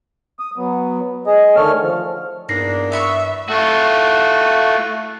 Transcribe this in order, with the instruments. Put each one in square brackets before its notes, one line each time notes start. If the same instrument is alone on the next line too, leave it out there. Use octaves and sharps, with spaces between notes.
[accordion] D#6
F#3 B3
G#4 D#5
D3 D#3 A3 A4 C#5 F6
F3
[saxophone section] E2 A#3 D4 [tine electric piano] G2 A#6 C7 [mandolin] D#4
[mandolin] B3 B5 C#6 [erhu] E5
[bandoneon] A3 [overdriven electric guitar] F4 F#4